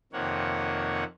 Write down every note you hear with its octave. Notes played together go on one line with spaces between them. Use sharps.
F2 C3 D#3 A#3 C#5 F#5